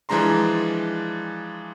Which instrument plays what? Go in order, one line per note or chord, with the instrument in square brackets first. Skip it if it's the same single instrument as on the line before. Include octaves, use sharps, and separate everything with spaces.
[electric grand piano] E3 F3 G#3 D4 A#5 C6